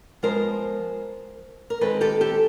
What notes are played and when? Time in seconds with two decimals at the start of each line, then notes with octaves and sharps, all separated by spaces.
0.23 F3 G#3 B3 A#4 C5
1.70 A#4
1.81 D#3 G#3 C4 A4 B4
2.01 G4 A4
2.21 G4 A4